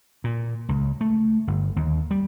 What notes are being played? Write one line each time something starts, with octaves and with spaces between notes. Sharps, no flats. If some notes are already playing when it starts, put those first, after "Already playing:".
A#2
C#2
A3
G1
D#2
G3